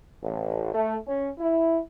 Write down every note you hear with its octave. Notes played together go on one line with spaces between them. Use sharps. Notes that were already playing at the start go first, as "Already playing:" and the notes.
A1
A3
C#4
E4